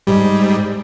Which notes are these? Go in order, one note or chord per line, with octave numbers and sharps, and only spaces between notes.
G#2 G3